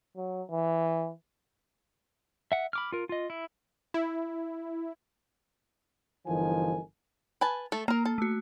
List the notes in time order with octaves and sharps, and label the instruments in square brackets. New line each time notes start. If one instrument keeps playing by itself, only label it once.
[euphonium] F#3
E3
[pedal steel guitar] E5 F#5
B5 D6 F6
F4 A#4
F4 D#5
E4
[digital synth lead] E4
[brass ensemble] G1 E3 F3 D#4 A#4 G#5
[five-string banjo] B4 G#5 A5
A3 A4
[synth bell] A#3 [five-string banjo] A#4 A#5
[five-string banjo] A4
[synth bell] A3 F#4